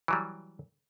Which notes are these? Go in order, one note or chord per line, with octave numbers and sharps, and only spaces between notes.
E3 F#3 G3